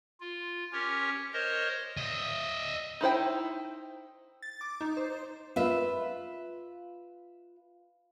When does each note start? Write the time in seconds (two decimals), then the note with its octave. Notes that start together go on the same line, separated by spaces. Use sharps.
0.20 F4
0.73 C#4 G4 A#4 C#5
1.33 A#4 C5 C#5 D#5
1.97 D#5 E5
3.01 D#4 E4 C5 G5
4.42 A6
4.61 D6
4.81 D#4
4.97 C5
5.56 F4 B4 E5